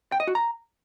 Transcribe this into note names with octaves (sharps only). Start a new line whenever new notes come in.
G5
D#5
F#4
A#5